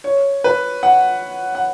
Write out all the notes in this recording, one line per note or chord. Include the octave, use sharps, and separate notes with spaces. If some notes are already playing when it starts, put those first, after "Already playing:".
C#5
B4
F#5
F#5